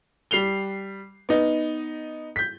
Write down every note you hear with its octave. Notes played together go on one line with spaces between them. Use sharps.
G3 C7 F7 G7
B3 D#4
G6 B6